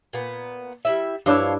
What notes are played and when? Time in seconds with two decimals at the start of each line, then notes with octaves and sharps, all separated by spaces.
0.13 A#2 B3
0.85 G3 E4 E5
1.26 G2 F3 D4 E4 C5 C#5